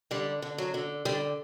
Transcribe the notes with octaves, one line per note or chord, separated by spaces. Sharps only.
D3 G3
D3
F#3
D3
D3 G3